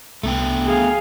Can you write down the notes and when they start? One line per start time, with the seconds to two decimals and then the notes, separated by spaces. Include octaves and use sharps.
0.23 C2 A3 B3 G5
0.65 G#4 F5